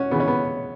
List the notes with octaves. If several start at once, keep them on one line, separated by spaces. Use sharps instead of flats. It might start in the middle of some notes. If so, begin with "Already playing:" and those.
Already playing: C#4 F#4
C#3 E3 B3
C#4
B3